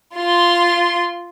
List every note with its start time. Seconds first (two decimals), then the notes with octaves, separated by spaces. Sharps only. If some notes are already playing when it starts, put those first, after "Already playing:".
0.16 F4 C6